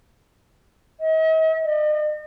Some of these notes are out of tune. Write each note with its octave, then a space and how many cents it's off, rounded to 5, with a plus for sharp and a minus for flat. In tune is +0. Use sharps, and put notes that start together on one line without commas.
D#5 +45
D#5 -45